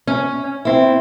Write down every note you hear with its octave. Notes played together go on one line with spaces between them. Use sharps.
C#4
C4 E4